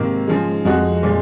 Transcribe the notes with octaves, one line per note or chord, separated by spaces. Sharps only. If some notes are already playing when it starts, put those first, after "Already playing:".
Already playing: G#2 C3 D#3 A#3
C#3 F3 G#3
F2 F3 G#3 D#4 F#4
A#2 F3 G#3